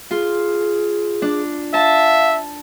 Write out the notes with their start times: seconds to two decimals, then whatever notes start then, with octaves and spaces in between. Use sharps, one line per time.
0.11 F4 G#4
1.22 D4
1.74 E5 F5 A5